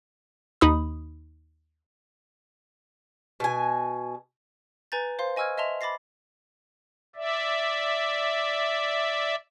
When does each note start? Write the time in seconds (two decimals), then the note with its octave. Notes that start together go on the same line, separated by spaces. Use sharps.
0.61 D#2 D#4 B5 D#6
3.40 B2 G#5
4.92 B4 G#5 A#5 G6 A6
5.19 C5 F5 C6
5.36 D#5 G#5 C#6 E6 F6 G#6
5.58 D#5 E5 A5 C6 F7
5.81 B5 D6 A6 A#6 C7
7.16 D5 E5